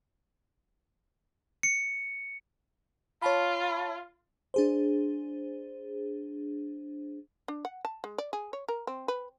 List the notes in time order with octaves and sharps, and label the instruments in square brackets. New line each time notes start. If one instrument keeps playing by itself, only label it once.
[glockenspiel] C#7
[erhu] F4 [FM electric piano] C#5 A5 B5
[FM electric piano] D4 G#4 C5
[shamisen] D4
F#5
A5
G#3
D5
G#4
C#5
A#4
C4
B4